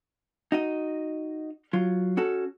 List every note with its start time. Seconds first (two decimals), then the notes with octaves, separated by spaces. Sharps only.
0.52 D#4 F#4 D#5
1.73 F#3 F4
2.17 C#4 F#4 A4